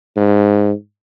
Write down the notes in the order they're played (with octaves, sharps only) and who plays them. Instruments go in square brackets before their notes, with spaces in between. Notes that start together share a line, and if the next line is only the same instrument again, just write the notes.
[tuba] G#2